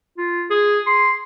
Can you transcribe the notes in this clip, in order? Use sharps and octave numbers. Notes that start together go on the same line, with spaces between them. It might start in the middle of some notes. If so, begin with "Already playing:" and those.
F4
G#4
C6